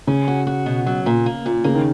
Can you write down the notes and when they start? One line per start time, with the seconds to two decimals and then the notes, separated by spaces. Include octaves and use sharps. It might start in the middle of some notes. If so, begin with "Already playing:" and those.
0.07 C#3 C#4
0.28 F#4
0.47 F#4
0.66 B2
0.86 F#3
1.06 A#2
1.26 A#3
1.46 A#2
1.64 C#3 A#3
1.75 D#3